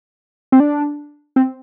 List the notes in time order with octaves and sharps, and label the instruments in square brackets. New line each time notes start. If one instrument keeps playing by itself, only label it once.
[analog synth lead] C4
D4
C4